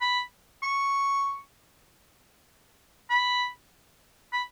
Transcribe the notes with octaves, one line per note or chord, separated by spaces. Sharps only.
B5
C#6
B5
B5